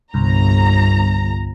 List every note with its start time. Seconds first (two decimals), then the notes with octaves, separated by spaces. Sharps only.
0.14 G1 C2 G2 A#5